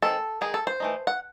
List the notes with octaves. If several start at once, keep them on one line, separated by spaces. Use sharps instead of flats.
D#3 G#3 C4 A4
D#3 G#3 D#4 G#4
A4
C5
E3 A3 D#4
F#5